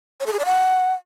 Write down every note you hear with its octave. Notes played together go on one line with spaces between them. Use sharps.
C#5
A4
G#4
D5
F#5